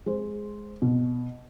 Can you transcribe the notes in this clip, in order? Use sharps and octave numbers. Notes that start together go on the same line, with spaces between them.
G#3 C5
B2